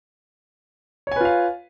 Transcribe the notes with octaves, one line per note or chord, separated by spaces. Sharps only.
F4 B4 C#5 F5 G#5